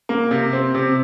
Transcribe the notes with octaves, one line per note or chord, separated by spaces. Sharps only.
A#3
C3
C4
C3